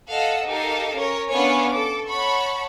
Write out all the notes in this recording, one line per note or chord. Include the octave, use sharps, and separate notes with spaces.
A4 D#5 F5 F#5 E6
D#4 G4 A4 A#4 F5
C#4 A#4 C#5
B3 C#4 D4 C#5 F5 G#5
A4 D6
C#5 F#5 A5 B5 C#6